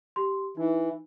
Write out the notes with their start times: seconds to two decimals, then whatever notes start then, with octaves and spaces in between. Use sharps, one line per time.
0.16 G4 C6
0.57 E3 D#4